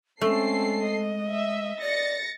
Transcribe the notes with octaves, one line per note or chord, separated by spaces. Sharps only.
G#3 A3 C4 C#4 A4 C7
D#5
E5
D5 A6 A#6 C#7